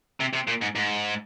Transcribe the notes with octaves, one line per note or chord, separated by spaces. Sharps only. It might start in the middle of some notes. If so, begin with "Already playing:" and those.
C3
C3
A#2
G#2
G#2